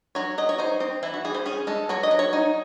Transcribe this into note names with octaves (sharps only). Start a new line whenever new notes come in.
F#3 C#5
F#3 D#5
C#5
D#4 C5
C4 C5
E3 E4
F#4
E3 G#4
C5
C#4 G#4
G#3 A4
F#3 C#5
D#5
F#3
C#5
D#4